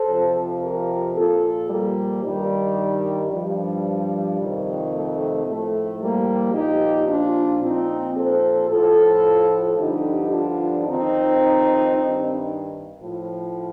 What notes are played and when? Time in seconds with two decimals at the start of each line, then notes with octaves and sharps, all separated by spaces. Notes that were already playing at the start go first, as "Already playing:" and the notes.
Already playing: A4 C5
0.08 F2 C3 F3
0.62 G4 A#4
1.16 A#2 F3 F4 A4
1.70 G3 A#3
2.24 G2 D#3 G3
3.31 G2 F3 G3
4.40 F2 C3 D#3
4.94 A3
5.47 A2 F3 A3
6.01 G3 A#3
6.54 A#2 F3 D#4 G4
7.08 D4 F4
7.62 A#2 F3 C4 D#4
8.16 A4 C5
8.70 A2 F3 F4 A4
9.78 G2 D3 F3 D#4 G4
10.31 D4 F4
10.85 F2 D#3 C4 D#4
11.93 G2 D#3
13.01 A2 F3